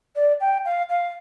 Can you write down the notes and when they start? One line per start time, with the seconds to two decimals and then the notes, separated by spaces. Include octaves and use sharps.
0.15 D5
0.40 G5
0.65 F5
0.89 F5